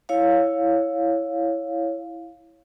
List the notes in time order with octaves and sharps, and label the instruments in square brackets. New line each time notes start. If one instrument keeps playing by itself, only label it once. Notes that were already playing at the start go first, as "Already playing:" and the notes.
[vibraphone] E4 C#5 F5